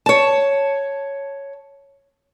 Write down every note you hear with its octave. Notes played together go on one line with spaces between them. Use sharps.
C#5 A5